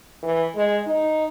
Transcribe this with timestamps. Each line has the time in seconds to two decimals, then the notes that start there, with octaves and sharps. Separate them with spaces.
0.22 E3
0.56 G#3
0.87 D#4